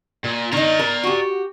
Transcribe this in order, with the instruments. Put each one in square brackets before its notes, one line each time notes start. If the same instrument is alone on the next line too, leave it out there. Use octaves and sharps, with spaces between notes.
[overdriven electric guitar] A#2
[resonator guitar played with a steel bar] D#3 D#4 [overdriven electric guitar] D5 A#5
[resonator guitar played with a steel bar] A#4
F#4 G4